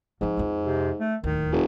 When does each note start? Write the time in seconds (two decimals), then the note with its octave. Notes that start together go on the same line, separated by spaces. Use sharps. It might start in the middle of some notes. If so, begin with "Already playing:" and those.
0.21 G#2 F3 C4
0.37 F2 F4
0.65 C3
1.00 A3
1.24 D1 D#2 D#3
1.52 F1